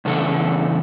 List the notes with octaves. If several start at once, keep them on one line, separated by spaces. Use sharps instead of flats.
E2 C#3 D4 A4